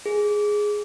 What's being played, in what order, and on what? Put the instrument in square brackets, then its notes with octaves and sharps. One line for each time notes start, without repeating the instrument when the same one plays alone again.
[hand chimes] G#4